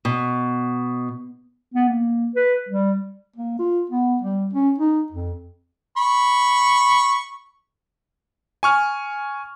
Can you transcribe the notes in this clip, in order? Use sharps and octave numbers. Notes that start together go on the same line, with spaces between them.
B2
B3
A#3
B4
G3
A#3
F4
B3
G3
C#4
D#4
F2
B5 C#6
G#5 C#6 F6